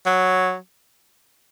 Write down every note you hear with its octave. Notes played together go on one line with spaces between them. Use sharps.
F#3